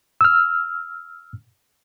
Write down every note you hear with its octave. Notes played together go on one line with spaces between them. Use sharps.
E6 F6